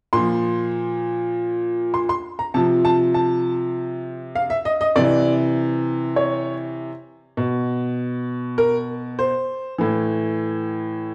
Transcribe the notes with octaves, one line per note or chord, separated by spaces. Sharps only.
A#2 F3 C6
C6
C6
A#5
C3 F3 A5
A5
A5
F5
E5
D#5
D#5
C3 E3 D5
C#5
B2
A#4
C5
A2 E3